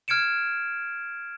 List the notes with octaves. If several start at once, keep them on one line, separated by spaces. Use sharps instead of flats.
F6 G#6 C#7 D7 E7